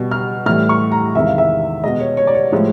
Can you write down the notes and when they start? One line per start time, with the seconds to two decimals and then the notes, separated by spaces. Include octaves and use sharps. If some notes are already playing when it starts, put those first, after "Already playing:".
Already playing: B2 G3
0.11 F6
0.46 A2 E3 G3 F6
0.69 C#6
0.92 A#5
1.15 E2 C3 D#3 G#3 E5
1.27 F5
1.38 E5
1.84 B2 G#3 D#5
2.00 C#5
2.17 C#5
2.27 D5
2.35 C#5
2.52 A2 F3 G#3